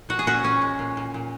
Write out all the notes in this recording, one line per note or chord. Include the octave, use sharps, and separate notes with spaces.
A#2 F#4
G#4
A#2 C#4 F#4
A#2 C#4
G#3
A#2
A#2
A#2